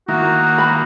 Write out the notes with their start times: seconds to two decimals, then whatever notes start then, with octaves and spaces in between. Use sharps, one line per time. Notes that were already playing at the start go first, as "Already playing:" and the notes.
0.08 D#3 A#3 E4 F#4
0.58 B5